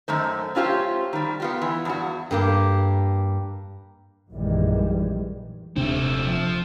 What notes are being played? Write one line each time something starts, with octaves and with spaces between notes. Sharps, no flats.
F#2 D#3 A3 C5
A3 C#4 F4 G4 C5
D#3 G3
B3 F4 G4
E3
E2 G2 F#4
G2 A#3 G4
A#1 F#2 D#3 E3 G3 G#3
D#1 C3 A3 C4 D4
F3